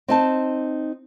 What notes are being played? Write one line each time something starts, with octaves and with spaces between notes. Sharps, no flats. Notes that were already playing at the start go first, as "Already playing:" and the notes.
C4 D#4 A5